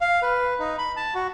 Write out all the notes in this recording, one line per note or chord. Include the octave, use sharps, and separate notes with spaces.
F5
B4
D#4
B5
A5
F#4